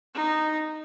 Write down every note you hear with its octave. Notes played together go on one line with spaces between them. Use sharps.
D#4